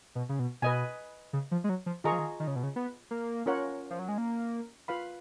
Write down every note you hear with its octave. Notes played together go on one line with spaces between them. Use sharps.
B2
C#3
B2
B2 B4 D#5 G#5
C#3
F3
G#3
F#3
F3
D#3 F4 G#4 D#5 A#5 C#6
F3
D#3
D#3
C#3
B2
C#3
B3
A#3
C#4 F4 A#4 C#5 F#5
F3
F#3
G#3
A#3
F4 B4 F5 B5